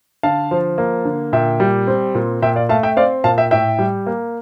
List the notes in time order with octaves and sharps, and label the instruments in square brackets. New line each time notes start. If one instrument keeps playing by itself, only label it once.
[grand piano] D3 F5 A5
F3
A#3
D3
A#2 E5 G5
G3
C4
A#2
A#2 E5 G5
D5 F5
A3 F5 A5
E5 G5
C4 D5 F5
A#2 F5 A5
E5 G5
A2 E5 G5
G3
A#3